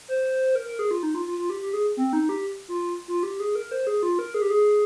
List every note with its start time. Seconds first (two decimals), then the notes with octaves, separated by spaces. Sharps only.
0.08 C5
0.55 A#4
0.67 A#4
0.79 G#4
0.91 F4
1.03 D#4
1.15 F4
1.26 F4
1.38 F4
1.50 G4
1.62 G4
1.73 G#4
1.97 C4
2.13 D#4
2.29 G4
2.68 F4
3.08 F4
3.23 G4
3.40 G#4
3.55 A#4
3.71 C5
3.87 G#4
4.03 F4
4.19 A#4
4.34 G#4
4.42 G4
4.50 G#4